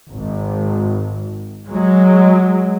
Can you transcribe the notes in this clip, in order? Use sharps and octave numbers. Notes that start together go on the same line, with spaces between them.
G#1
F#3 G#3